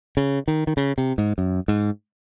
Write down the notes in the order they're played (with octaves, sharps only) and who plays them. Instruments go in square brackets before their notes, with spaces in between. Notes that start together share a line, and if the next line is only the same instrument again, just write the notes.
[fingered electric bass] C#3
D#3
D#3
C#3
C3
G#2
F#2
G#2